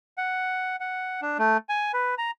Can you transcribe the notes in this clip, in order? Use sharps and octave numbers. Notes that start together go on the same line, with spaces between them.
F#5
F#5
D4
A3
G#5
B4
A#5